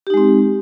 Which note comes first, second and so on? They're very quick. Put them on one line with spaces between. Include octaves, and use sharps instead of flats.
G4 D#4 G#3 C4